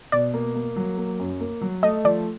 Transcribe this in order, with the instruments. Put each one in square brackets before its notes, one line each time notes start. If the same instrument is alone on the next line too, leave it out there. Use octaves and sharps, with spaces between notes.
[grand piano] B2 [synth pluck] D5
[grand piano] A#3
A#3
F#3
A#3
F#2
A#3
F#3
[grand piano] A3 [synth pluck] D#5
[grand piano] F3 [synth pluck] D5